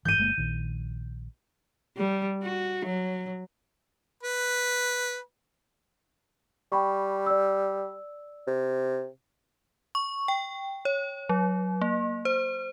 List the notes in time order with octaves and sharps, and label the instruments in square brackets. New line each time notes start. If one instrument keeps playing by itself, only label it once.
[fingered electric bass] G1 G#2 E3 [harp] G6 D#7
[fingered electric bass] G1 G#3 A#3
A#1 D#3
[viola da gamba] G3
F#4
F#3
[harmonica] B4
[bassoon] G3 [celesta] G5 B5 C#6
[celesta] D5 E6
[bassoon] C3
[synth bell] C#6
G5
C#5
F#3
A#3
C5